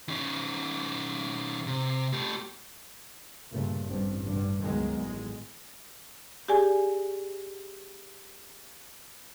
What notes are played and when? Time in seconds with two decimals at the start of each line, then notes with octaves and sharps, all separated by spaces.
0.09 D#3 C#4
1.67 C3
2.13 A3 G4
3.52 G2 A#2 C#3 A3
3.85 A1 G2 C4
4.25 G2 D3
4.61 C#2 D#3 F#3 G#3 B3
4.99 A1 G#3
6.48 G4 G#4 D5 G#5